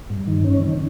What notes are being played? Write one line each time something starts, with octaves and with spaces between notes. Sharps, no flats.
G2
D#3
C#4
D#3